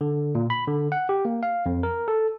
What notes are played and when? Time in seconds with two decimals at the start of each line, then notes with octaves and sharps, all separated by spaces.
0.01 D3
0.35 A#2
0.50 B5
0.67 D3
0.92 F#5
1.09 G4
1.25 A#3
1.43 F5
1.66 F2
1.83 A#4
2.08 A4